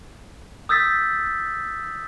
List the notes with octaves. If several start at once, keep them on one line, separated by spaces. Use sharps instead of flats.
D#6 E6 G6 A6 B6